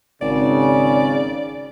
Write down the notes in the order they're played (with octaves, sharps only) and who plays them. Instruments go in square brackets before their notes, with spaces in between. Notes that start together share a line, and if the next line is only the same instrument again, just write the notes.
[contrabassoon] G#1 [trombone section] C#3 [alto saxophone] D5